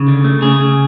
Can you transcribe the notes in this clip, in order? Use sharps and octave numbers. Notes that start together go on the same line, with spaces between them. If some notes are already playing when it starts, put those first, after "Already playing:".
Already playing: C#3
D3
A3
C#3 G#4
C#3